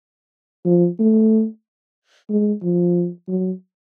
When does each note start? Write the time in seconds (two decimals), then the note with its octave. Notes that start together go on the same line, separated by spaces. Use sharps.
0.65 F3
0.99 A3
2.30 G#3
2.62 F3
3.28 F#3